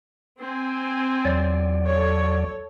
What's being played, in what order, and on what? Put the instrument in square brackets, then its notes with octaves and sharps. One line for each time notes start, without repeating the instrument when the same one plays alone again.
[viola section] C4 G#5
[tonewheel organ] E2 F#3 D5
[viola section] A4 C#5